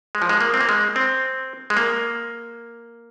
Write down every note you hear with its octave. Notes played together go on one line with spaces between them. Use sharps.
G#3
F3
G#3
A#3
C4
A#3
G#3
C4
G#3
A#3